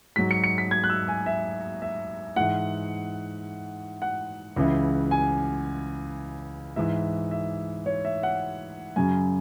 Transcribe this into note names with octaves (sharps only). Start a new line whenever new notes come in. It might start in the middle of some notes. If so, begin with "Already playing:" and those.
G#2 F#3 B6
C#7
C#7
B6
G#6
F#6
E6
G#5
E5
E5
G#2 E3 F#5
F#5
C#2 C#3 E3
G#5
G#2 E3 E5
E5
C#5
E5
F#5
F#2 C#3 F#3 G#5